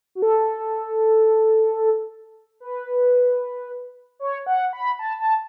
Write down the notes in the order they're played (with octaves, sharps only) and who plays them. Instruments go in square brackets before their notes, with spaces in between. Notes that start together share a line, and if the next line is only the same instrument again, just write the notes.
[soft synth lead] F#4
A4
B4
C#5
F#5
B5
A5
A5